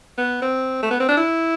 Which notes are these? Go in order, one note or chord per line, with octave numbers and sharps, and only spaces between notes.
B3
C4
A3
B3
C4
D4
E4